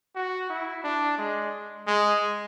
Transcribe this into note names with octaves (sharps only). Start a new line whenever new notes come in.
F#4
E4
D4
G#3
G#3